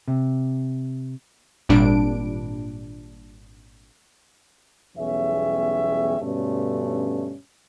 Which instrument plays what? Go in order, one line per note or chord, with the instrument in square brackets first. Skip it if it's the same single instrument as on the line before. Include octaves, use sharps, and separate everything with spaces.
[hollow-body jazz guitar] C3
[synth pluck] G#1 A#2 G3 D4 D7
[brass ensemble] B1 E2 G3 C#4 G#4 E5
G2 B2 D3 A3 C#4